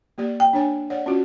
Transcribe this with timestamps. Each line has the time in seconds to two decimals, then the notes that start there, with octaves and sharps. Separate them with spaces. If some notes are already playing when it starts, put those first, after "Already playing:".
0.18 A#3 G4 D5
0.40 G5
0.53 D4 C#5 G#5
0.90 C#5 D5 F#5
1.06 C#4 F4 F#4